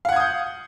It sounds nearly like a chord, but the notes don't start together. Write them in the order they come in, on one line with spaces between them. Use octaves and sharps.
F5 F#5 G#6 D#6 G6